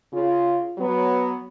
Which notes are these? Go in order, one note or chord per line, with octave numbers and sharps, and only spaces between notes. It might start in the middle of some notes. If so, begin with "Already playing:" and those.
C#3 F4
F#3 B3